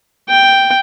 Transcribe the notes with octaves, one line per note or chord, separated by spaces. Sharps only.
G5